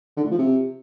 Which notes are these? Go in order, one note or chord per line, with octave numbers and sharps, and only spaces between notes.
D3
A2
F3
C3